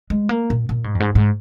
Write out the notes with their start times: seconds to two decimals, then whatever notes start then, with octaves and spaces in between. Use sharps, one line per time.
0.10 G#3
0.29 A#3
0.50 A#2
0.69 A#2
0.84 G#2
0.95 F2
1.00 G#2
1.15 G#2